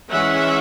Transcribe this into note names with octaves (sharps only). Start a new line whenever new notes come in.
E3 G#3 C#4 E5 F#5